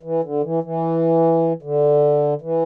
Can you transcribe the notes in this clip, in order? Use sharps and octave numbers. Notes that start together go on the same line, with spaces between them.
E3
D3
E3
E3
D3
E3